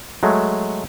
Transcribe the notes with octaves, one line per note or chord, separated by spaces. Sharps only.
F#3 G#3 A3